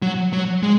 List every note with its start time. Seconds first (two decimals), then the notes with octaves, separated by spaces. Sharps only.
0.02 F#3
0.33 F#3
0.63 G#3